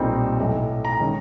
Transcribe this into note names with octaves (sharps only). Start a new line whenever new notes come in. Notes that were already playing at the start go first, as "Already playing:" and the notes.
Already playing: B1 A#2 G3 C4 D#4
B1 A2 F#3
A#5
D#3 G#3 C#4